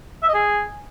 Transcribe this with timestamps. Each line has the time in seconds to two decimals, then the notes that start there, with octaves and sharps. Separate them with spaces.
0.23 E5
0.28 D#5
0.34 G#4